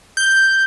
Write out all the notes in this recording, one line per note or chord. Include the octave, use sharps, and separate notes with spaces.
G6